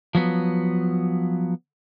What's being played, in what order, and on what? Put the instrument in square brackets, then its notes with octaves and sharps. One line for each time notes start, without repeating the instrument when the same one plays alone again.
[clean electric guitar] F3 F#3 B3